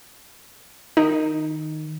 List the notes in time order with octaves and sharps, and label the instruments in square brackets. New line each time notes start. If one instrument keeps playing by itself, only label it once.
[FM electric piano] D#3 [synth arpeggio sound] D#4